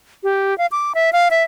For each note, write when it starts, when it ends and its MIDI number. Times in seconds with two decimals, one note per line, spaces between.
0.23 0.57 67
0.58 0.66 77
0.72 0.93 86
0.95 1.13 76
1.13 1.29 77
1.31 1.43 76